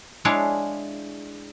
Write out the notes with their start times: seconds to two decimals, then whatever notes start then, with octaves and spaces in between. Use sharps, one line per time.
0.25 G#3 D4 E4 C#5 F5 C6